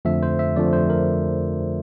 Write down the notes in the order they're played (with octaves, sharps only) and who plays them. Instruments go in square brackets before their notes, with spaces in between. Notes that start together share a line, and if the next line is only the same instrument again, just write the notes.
[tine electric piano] F2 D3 F3 A3 E5
C5
E5
F2 D3 F3 A3 D5
C5
A#4